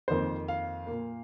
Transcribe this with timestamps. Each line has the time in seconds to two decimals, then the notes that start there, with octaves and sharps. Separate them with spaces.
0.08 F2 D#3 A#3 C5
0.48 F5
0.87 A#2 A#3